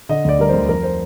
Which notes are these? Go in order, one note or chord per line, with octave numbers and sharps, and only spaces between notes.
D3 D#5
D2 D5
G3 A#4
D2 C5
F2 A#4
C5